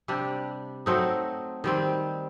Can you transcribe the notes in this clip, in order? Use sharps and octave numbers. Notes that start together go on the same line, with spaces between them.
C3 G3 D4 G4
F#3 A3 C4 D#4
D#3 G3 C4